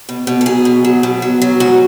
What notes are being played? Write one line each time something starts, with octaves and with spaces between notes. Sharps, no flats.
B2
B2
A4
F#3 G#4
B2
F#3
B2
F#3
F#3
G#2 F#4